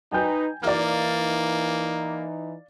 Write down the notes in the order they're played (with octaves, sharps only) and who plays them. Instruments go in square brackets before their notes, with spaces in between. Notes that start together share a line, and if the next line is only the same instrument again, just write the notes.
[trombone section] D#4 B4 [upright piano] G5 G#5 G6
[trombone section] E3 D#4 [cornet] A#3 [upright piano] D5 F5 F6